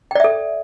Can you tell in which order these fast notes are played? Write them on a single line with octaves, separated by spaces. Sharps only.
G5 D5 E5 A4